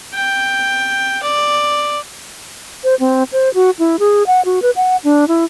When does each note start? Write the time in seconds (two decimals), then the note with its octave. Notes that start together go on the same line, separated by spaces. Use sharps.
0.14 G5
1.23 D5
2.84 C5
3.00 C4
3.33 C5
3.54 F#4
3.79 E4
3.99 G#4
4.27 F#5
4.45 F#4
4.62 B4
4.76 F#5
5.04 D4
5.28 E4